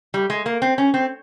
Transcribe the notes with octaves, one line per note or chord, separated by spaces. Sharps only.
G3
G#3
A#3
C4
C#4
C4